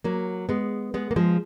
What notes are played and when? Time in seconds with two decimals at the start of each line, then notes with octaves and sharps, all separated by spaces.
0.04 F#3 A#3
0.49 G#3 B3
0.94 G#3 B3
1.11 A#3
1.16 F3 G#3